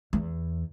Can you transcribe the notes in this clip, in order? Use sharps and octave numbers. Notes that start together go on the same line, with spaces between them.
E2